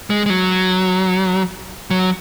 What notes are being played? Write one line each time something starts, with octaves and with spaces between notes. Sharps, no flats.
G#3
G#3
F#3
F#3